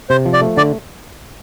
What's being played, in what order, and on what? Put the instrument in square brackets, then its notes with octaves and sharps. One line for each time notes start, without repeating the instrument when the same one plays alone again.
[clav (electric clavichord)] C3 [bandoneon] C5
[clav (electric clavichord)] F3
[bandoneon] D5
[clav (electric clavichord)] A3
[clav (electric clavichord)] D3 [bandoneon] D5